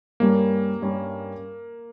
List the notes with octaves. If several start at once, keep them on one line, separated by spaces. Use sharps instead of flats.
G2 G3 A#3 C#4
G2 G3 C#4